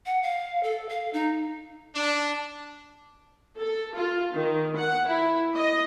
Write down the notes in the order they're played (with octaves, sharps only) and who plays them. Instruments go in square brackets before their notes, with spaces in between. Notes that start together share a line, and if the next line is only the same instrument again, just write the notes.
[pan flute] F#5
F5
A4
F5
D#4
[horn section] D4
[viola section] A4
F4
D#3
F#5
E4
D#5